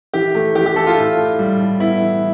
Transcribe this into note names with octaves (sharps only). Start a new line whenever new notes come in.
E3 G4
A3
E3 G4
G4
A3 A4
F4
A2
A2
G3
A2
B3 E4
E3